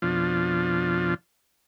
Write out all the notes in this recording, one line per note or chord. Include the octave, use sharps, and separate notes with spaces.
F2 B2 F3 D4 F4